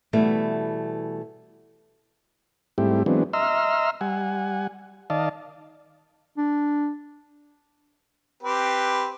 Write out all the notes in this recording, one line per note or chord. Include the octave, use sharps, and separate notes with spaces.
B2 E3 G3 A3 B3
G#2 G3 A3 C4 E4 G4
E3 F#3 G#3 B3 C4 D4
D#5 E5 A#5 C6 E6 F6
G3 F#5 G#5
D#3 D5 D#5 F5 A5
D4
C4 G4 B4